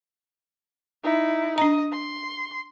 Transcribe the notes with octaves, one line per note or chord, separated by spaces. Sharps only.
D#4 E4
D4 D#5 A#5
C6